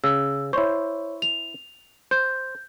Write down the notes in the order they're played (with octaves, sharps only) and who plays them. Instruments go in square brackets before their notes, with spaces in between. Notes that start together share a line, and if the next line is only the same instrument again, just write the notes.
[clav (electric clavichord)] C#3 [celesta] E6
[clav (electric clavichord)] E4 C5 [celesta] C#5 C#6
[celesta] F7
[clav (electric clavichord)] C5 [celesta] G6